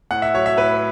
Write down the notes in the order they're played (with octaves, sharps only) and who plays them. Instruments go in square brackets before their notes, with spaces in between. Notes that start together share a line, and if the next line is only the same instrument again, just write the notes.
[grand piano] A2 F#5
E5
F#3 C#5
E5
A2 B4